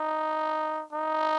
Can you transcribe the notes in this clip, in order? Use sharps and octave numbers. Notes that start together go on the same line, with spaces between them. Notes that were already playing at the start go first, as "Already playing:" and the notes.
Already playing: D#4
D#4